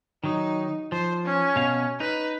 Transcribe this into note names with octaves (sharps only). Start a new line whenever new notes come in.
D#3 F#3 D#4
F3 C5
C#4
B2 F5
D#4 B4